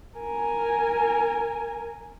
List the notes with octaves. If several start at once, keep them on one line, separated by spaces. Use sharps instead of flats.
A#4 G#5